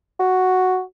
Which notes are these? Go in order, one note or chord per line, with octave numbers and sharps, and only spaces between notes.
F#4